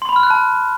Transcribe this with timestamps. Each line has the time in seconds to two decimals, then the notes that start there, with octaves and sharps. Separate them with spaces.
0.02 C6
0.09 B5
0.16 F6
0.23 F#6
0.30 A5